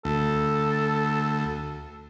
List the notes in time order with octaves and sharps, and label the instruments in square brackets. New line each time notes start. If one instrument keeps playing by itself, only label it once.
[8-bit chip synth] D2 [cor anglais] A4